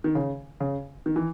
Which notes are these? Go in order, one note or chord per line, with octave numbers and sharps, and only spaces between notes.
D#3
C#3
C#3
D#3
E3